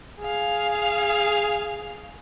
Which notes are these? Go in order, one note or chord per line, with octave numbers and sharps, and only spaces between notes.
G#4 F5